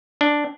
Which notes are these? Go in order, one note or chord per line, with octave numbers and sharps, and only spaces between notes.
D4